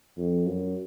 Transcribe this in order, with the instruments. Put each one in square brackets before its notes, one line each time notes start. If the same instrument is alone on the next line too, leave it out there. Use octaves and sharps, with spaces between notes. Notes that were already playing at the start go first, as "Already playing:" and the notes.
[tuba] F2
F#2